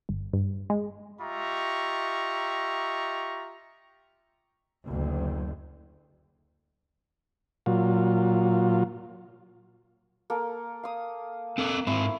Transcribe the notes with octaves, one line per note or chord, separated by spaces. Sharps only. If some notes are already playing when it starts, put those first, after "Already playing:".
G1
G2
G#3
F4 G4 D#5 E5 A#5 C#6
F#1 D2
A#2 F#3 F4
A#3 A4
F5 D#6
C4 A4 A#4
G#2 C4 E4 C#6